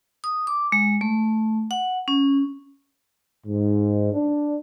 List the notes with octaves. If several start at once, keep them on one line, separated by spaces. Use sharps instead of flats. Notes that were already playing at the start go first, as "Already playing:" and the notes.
D#6
D6
G#3
A3
F#5
C#4
G#2
D4